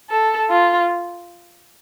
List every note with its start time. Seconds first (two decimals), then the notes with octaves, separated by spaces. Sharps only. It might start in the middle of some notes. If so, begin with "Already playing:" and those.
0.10 A4
0.50 F4